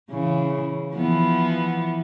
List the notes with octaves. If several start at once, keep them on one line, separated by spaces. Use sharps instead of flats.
C#3 E3
E3 F3 B3